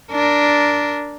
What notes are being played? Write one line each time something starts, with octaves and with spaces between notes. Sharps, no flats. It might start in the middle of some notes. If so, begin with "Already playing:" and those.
D4 A#4